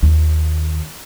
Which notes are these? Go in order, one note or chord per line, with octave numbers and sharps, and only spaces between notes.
D#2 D#3